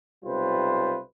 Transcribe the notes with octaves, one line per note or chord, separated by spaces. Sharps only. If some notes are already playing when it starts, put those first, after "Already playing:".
B1 C3 G3 F4 B4 C5